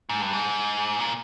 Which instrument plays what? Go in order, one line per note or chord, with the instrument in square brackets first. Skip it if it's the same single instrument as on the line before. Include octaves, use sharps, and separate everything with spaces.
[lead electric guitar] G#2
G2
G#2
A#2